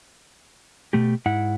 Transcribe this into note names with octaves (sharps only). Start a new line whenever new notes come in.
B2 A3 G4
G#2 E4 F#5